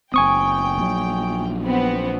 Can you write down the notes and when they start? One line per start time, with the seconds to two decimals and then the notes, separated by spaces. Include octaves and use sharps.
0.14 F#1 C4 G5 G#5 C#6 D#6
0.78 A#1 F#3
1.64 B3 C4